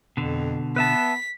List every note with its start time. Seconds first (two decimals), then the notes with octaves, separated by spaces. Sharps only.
0.17 F2 B2 D3
0.76 B3 B4 E5 A5 B6